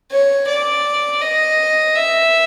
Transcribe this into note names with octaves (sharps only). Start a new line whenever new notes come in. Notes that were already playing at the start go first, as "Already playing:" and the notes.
C#5
D5
D#5
E5